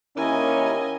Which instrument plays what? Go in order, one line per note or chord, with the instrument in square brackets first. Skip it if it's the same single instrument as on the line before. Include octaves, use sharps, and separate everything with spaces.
[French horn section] D#2 C#4 [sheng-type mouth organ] E4 A#4 [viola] D#5 G#5